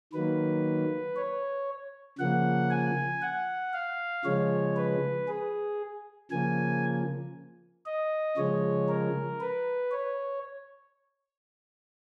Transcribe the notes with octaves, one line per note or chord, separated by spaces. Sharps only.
D#3 F#3 A#3 B4
C#5
C#3 F3 A#3 F#5
G#5
F#5
F5
C#3 F3 G#3 C#5
B4
G#4
C#3 F3 A#3 G#5
D#5
C#3 F3 G#3 C#5
A#4
B4
C#5